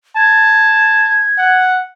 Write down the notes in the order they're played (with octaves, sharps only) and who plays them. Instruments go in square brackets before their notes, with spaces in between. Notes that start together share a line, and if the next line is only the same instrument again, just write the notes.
[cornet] A5 [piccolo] G#6
[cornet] F#5